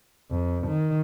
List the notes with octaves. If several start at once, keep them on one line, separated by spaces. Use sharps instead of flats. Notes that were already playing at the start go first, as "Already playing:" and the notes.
F2
D#3